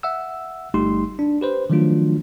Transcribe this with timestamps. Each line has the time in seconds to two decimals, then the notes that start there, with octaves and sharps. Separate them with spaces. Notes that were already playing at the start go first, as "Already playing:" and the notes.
0.03 E5 F#5 E6
0.74 G1 G3 A3 D#4 G4 C6
1.19 D4
1.41 G4 B4 C5
1.70 D#3 F3 F#3 A3 D4 F4